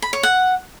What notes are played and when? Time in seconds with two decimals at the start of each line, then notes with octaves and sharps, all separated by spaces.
0.02 B5
0.13 C#5
0.23 F#5